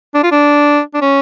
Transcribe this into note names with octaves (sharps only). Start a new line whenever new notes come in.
D4
F4
D4
D4
C#4